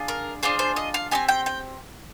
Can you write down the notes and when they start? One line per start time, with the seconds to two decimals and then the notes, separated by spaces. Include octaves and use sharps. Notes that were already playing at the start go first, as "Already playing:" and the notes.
Already playing: D4 F4 G#4
0.08 A#4
0.43 D4 F4 G#4 C5
0.59 C5
0.76 D#5
0.94 F5
1.11 C4 D#4 G4 G#5
1.28 G5
1.46 G5